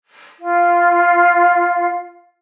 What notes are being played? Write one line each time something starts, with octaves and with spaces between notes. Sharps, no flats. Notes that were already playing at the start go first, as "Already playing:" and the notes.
F4 F5